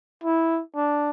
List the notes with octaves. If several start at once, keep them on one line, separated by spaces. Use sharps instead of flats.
E4
D4